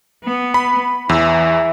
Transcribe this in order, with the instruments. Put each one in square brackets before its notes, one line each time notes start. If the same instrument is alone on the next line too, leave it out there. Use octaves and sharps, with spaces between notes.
[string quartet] B3
[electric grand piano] B5
[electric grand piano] E2 [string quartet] E3 [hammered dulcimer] E5